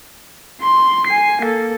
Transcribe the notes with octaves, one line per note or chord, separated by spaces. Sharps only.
C6
G#5 C7
A#3 A4